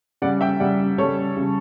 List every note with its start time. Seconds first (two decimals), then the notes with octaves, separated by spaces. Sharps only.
0.22 C#3 G3 D5 F#5
0.41 E5 G5
0.60 C#3 G3 D5 F#5
0.98 C#3 G3 A4 C#5
1.37 C#3 G3